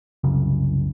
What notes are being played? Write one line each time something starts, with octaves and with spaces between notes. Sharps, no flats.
C2 F#2 C#3